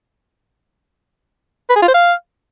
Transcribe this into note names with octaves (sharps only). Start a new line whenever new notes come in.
B4
G#4
F4
C5
F5